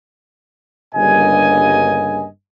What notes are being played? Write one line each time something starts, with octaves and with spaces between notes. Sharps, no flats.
G1 G2 C#3 A#3 D#5 G#5